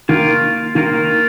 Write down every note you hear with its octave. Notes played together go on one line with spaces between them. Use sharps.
D#3 A#3 F4 A#4
D#3 A#3 F4 A#4